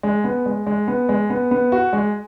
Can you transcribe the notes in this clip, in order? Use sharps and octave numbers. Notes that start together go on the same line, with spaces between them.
G#3
B3
G#3
G#3
B3
G#3
B3
B3
F#4
G#3